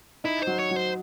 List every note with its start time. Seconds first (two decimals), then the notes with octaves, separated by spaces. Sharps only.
0.24 D#4 E4
0.42 C5
0.47 F#3
0.59 C#5
0.71 F#3
0.76 C5